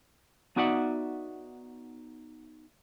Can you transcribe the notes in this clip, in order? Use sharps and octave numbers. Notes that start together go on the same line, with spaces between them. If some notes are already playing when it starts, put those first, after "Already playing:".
B3 D#4 F#4 D5 E5 F#5